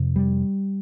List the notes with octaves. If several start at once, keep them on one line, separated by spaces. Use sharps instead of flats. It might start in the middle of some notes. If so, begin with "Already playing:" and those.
Already playing: F2 C3
G3